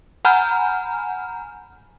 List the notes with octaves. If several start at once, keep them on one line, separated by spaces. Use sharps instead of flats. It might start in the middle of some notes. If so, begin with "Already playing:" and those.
F#5 G#5 A#5 B5 F6 G6